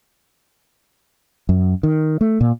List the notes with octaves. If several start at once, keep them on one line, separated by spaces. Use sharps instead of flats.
F#2
D#3
A3
A#2